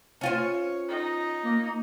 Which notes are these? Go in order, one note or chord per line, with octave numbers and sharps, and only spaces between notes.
C#4 F4 C5 C#5
D#4
A#3